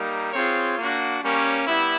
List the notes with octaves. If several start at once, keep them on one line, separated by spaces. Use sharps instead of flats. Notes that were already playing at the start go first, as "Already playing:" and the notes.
Already playing: G3 A#3 D#4
C4 F4 G#4 C#5
A#3 D4 F#4
G3 A#3 C#4
G3 B3 E4